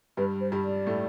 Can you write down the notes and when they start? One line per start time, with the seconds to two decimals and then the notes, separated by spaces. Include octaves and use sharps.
0.17 G2 G3 B4
0.41 C5
0.52 G2 G3
0.64 D5
0.86 A2 A3